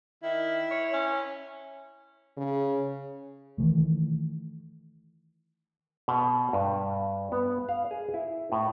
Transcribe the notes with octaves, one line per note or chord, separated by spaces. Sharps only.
D#3 E4
C#5
C#4
C#3
D#3 E3 A3
B2
G2
B3
F5
G#4
E4
A2